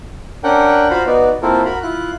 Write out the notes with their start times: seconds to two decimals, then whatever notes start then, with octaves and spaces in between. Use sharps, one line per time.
0.44 C#4 D4 A#4 F#5 G5
0.90 F4 F#4 C5 F5 A#5 B5
1.06 B3 D#4 F#4 D5
1.42 A#3 C4 E4 F4 A4 A#4
1.65 F#4 A#4 A#5 B5
1.83 E4 F4 F#6